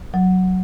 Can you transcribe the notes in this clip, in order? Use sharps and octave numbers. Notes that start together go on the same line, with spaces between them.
F#3